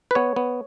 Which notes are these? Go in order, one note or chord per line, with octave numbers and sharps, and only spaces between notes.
B4
B3 C#5
B3